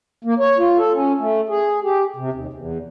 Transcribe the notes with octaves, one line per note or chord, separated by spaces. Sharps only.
A#3
C#5
F4
A4
C#4
A3
G#4
G4
C3
D#2
E2